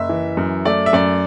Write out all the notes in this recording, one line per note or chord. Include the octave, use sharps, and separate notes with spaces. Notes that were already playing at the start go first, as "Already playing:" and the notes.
Already playing: F#1 E5
E3
F#2
A3 D5
E5
F#2 D5